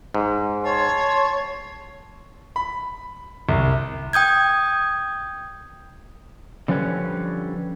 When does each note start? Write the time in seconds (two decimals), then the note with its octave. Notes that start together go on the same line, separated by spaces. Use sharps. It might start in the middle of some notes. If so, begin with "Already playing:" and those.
0.14 G#2
0.64 C#5 A5 C6
2.56 B5
3.49 C2
4.13 G5 D#6 G6 G#6
6.68 D3 F3 G3 C#4 B4 C#5